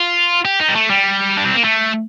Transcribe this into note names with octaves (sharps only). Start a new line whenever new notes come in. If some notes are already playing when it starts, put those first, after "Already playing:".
Already playing: F4
G4
D#4
G3
A3
G3
D4
C4
A#3
A3